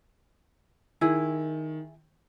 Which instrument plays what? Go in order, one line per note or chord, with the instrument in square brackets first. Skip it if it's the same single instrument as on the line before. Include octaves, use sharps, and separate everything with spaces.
[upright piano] D#3 [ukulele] E4 G#4